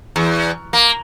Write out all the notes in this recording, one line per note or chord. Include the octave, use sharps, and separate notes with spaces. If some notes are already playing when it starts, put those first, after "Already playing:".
E2
A#3